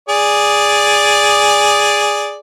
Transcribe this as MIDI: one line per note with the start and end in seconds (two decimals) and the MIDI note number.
0.09 2.39 68
0.09 2.39 74